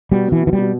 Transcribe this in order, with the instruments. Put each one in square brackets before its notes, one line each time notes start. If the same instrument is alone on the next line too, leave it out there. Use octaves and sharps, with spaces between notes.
[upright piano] B2 [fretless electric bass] G3
[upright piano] B2 [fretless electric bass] E3
[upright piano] B2 [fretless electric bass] E3
[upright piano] B2 [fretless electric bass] G3